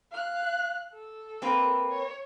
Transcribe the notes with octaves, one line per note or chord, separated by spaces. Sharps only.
F5 F#6
A4
A#3 C4 B4
C#5